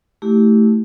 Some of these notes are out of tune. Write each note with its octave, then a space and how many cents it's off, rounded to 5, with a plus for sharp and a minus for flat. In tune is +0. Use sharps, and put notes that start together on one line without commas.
A3 +0 E4 -20 G4 +0